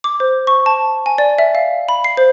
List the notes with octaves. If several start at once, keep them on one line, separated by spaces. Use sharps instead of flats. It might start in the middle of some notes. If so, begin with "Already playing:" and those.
D6
C5
C#6
A5
G#5
D5
E5
F5
B5
C7
C5